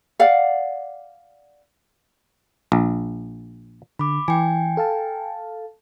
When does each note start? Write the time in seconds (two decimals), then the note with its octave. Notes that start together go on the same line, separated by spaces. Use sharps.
0.19 D5 F5 F#5
2.72 A#1
3.99 D3 B5 D6
4.28 E3 G5 G#5
4.77 A4 F5 A5